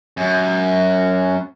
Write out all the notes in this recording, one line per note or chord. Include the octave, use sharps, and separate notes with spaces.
F#2